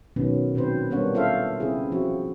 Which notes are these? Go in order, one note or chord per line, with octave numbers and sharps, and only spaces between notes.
B2 D#3 F#3 B3 C#4
A#2 D#3 F#3 C4 B4 C5
G3 A#3 B3 D4 C#5 F#5
F4 A4 C5 E5 F5
C#3 C4 E4 G#4
F3 C4 F#4